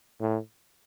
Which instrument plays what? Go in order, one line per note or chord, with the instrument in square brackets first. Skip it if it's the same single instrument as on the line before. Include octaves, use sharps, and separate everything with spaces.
[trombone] A2